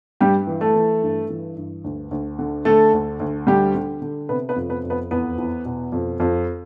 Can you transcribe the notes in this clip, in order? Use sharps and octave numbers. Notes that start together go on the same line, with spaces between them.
G2 G3 G4
E3
A3 A4
E3
G2
E3
G2
D2
D2
D3
D3 A3 A4
D2
D2
D3 G3 G4
D3
D3
C3 B3 B4
B3 B4
F2
B3 B4
F2
B3 B4
E2 B3 B4
E2
B2
F2
F2